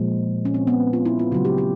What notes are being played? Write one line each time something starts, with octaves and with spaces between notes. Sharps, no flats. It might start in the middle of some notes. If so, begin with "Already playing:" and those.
Already playing: A#2 F3 G#3
C#4
C4
B3
F4
E4
F4
C#3 F#3 A3 F#4
G4
G4